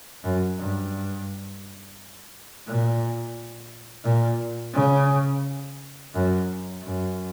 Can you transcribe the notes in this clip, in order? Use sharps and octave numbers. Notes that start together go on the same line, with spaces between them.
F#2
G2
A#2
A#2
C#3
F#2
F#2